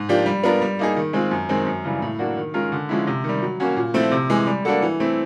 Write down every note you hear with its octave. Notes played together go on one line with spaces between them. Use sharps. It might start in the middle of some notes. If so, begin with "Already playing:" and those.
Already playing: G#2
F3 A#3 D4 G4
G3
B3 D4 F4 A#4
G3
A#3 D#4 G#4
D#3
G#3 C4 F4
F#2
D#3 G#3 C4
F#2
C#3 E3 G3
A2
F#3 A#3 D4 F#4
D#3
G#3 C#4 F4 A#4
D3
F3 G#3 C#4 E4
C3
D#3 G3
F#3
A#3 C#4 F#4
A#2
F3 A3 C4 E4
C3
E3 G#3
G3
A#3 D4 F#4 A4
E3
A3 C4 E4